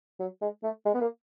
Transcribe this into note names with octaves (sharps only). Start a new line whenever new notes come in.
F#3
G#3
A3
G#3
B3
A#3